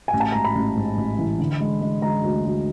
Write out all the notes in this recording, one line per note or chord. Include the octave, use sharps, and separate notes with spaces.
G#5
A1
A5
G#2 A#5
B5
A1
G#2
A1
E3
D3
G#3
G#3
G#3 A#5
D2
D2